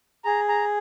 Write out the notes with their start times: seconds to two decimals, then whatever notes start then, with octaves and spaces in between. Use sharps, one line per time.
0.24 G#4 A#5
0.49 A#5